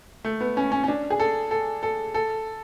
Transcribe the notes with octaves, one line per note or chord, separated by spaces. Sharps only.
A3
B3
C#4
C#4
C#4
D4
G#4
A4
A4
A4
A4